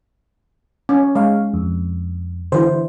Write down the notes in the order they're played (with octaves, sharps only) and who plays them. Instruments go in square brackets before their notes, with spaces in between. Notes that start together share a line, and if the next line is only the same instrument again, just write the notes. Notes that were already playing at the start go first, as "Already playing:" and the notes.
[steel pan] C#4
[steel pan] G#3 [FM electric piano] C#5 F5
[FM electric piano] F2
[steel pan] D3 E3 [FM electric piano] C5